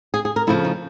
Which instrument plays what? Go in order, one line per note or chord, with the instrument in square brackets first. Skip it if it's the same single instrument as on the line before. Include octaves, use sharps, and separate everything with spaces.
[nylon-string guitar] G#4
G#4
A#4
C#3 F3 A3 E4
D#4